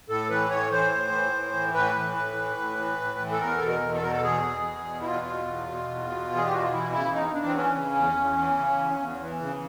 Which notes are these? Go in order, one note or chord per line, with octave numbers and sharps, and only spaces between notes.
A2 A4
E3 B4
A2 C#5
E3 C5
A2
E3
A2
E3
A2 B4
E3
A2
E3
A2
E3
A2
E3
A4
E2 A#4
B2 A4
A#4
E2
A4
B2 A#4
A4
E2 G#4
B2
E2
B2
E4
E2 F4
B2
E2
B2
E2
B2
E2
G#4
G4
B2 F#4
F4
E3 E4
C#3 E4
E2 D#4
E2 D4
C4
E3 C#4
C#3
E2
E2
E3
C#3
E2
E2
E3
C#3